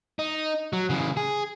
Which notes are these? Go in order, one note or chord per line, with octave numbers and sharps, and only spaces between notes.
D#4
F#3
C#3 E3
G#4